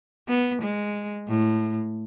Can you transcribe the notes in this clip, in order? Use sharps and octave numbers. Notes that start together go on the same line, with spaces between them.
B3
G#3
A2